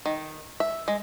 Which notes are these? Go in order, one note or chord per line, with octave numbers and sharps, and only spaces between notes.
D#3
E5
G#3